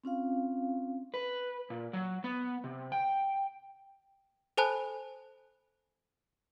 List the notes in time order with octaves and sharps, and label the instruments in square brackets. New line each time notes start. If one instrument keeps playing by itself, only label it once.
[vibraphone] C4 C#4 F4 F5
[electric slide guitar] B4
A#2
F#3
B3
C3
G5
[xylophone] A4 C5 G#5 A5 B5 F#6